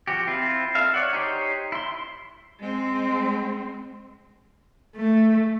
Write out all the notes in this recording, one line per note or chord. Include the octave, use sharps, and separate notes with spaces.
F3 F#4 G4
C4 E4 F4
A4 E5 F5
C#5 D5 F#5
D#4 G4 C5 C#5
E4 C6
G#3 C4
A3